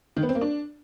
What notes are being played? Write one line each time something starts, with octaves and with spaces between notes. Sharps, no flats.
D#3
B3
C4
A#3
D4